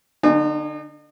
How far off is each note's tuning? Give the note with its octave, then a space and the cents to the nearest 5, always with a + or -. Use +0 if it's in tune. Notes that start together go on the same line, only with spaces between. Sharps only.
D3 +0 D#4 -40 G#5 +0